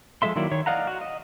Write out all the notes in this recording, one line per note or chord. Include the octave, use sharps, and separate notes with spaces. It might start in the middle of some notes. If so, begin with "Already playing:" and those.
F3 G#3 A4 E5 C6
D#3 F#3 A#3 E4 D5
D#3 C#5 C#6
D5 D#5 F5 F#5 A#5
F#4
D#5